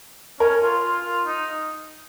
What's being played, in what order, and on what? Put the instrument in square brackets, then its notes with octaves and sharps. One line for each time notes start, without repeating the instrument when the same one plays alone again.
[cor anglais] C#4 [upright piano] A#4
[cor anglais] F4
F4
F4
D#4